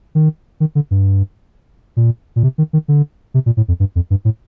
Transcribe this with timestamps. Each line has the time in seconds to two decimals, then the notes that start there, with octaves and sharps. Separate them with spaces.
0.15 D#3
0.60 D#3
0.75 D3
0.91 G2
1.97 A#2
2.36 A#2
2.43 C3
2.58 D#3
2.73 D#3
2.88 D3
3.34 C3
3.46 A#2
3.57 A2
3.68 F2
3.80 G2
3.95 F2
4.10 G2
4.25 A2